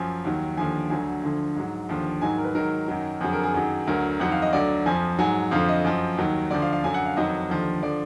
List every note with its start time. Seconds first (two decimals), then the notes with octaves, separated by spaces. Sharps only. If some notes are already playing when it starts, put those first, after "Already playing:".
Already playing: F#2 F3 G#5
0.25 D#2 D#3 F#3
0.57 D#2 D3 F3 G#5
0.90 D2 D3 F#3 G#5
1.23 D2 D3 F3
1.56 G#2 F#3
1.89 D#2 D3 F3
2.21 G#2 D#3 F#3 G#5
2.38 A#4
2.44 B4
2.55 G#2 D#3 F#3 A#4
2.88 F#2 D#3 F#3
3.21 F2 D3 F#3 G#4
3.33 A#4
3.43 G#4
3.54 F#2 D#3 F#3
3.87 D2 D3 F#3 A#4
4.20 F2 D#3 F#3 F#5
4.32 F5
4.42 D#5
4.53 D2 D3 F#3 D5
4.86 F2 F3 G#5
5.19 G#2 F#3 G#5
5.51 F2 D3 F3 F5
5.68 D#5
5.85 F#2 F3
6.17 D#2 D#3 F#3
6.50 D2 D3 F3 D5
6.62 F5
6.73 F5
6.83 F#2 D3 F#3 G#5
6.94 F#5
7.06 F5
7.16 F2 D#3 F#3 D#5
7.50 D#2 D3 F3
7.82 D3 F3 D5